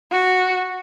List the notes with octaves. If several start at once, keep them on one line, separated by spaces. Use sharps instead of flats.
F#4